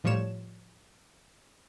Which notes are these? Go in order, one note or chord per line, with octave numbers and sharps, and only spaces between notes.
A2 F3 G3 C#5 E7